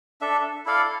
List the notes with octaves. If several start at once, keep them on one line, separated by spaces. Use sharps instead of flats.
D4 A4 E5
E4 A4 D5 F5